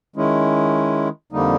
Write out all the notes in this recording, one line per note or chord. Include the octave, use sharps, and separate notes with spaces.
D#3 G#3 C#4 E4
F2 D3 G3 A#3 D#4